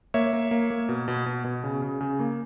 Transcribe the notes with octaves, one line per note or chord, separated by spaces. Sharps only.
A#3 C#5 E5
A#3
A#3
A#3
B2
B2
B2
B2
C#3
C#3
C#3
A#3